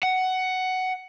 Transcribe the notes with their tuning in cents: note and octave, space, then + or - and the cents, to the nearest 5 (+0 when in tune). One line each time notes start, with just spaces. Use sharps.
F#5 +10